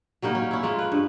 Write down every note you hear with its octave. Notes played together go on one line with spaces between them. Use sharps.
F#3 G3 A#3 D#4
C#4
C#4 E4
G#3 A#3 F4
B4
G2